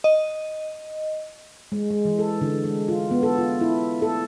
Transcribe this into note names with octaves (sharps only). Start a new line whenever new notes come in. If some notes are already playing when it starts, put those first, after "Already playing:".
D#5
G#3
G#3
E3
A4
D3
G#3
F4
B3
A4
F4
E4
A4